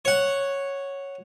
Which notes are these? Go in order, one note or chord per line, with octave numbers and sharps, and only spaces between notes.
C#5 F#5